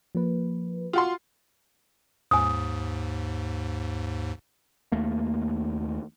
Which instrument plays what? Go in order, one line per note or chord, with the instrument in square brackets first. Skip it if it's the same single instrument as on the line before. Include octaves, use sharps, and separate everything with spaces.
[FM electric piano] F3 A#3 B4
[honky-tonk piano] F4 F#4 C6
[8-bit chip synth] D#2 G#2 [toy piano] G#5 D#6
[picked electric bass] D#2 A3 A#3